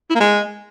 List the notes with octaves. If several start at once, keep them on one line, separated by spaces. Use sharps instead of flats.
E4
A#3
G#3